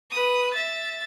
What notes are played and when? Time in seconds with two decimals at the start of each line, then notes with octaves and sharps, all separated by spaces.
0.11 B4 D#6
0.54 E5 A6